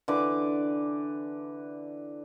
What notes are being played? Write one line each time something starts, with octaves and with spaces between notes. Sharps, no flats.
D3 E3 B4 D6